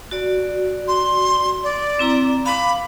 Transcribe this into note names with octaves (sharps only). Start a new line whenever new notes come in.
F#4 D5
C6
D5
C4 E4 A#5
F5 B5 D6